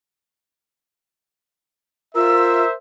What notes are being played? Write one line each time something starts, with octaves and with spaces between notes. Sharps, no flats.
F4 A#4 C5 E5 E6